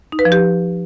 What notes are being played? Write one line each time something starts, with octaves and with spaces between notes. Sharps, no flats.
D#4
B4
F3
G4